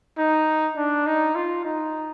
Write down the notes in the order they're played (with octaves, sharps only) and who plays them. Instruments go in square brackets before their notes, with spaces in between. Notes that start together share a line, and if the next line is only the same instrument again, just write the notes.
[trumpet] D#4
D4
D#4
F4
D#4